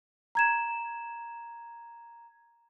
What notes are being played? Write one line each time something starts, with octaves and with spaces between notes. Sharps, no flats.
A#5 G#6 E7